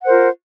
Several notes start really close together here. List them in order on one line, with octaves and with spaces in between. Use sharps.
F#5 C5 A#4 F4